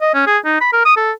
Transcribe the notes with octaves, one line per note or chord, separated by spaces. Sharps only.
D#5
C#4
G#4
D#4
B5
A#4
D#6
A4